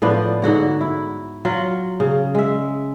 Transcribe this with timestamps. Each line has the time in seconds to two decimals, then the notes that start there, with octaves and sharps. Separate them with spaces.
0.02 A2 F3 B3 D4
0.42 G#2 D3 F#4 C#5
0.81 E4
1.45 F#3 F4
2.00 C#3
2.35 G#3 E5